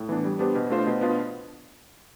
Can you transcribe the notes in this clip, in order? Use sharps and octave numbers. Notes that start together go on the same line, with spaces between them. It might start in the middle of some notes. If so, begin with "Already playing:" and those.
Already playing: A2
E3 B3 D4
G3
B3 D4 G4 C5
B2
A3 D4 F4 C5
B2
B3 D4 F4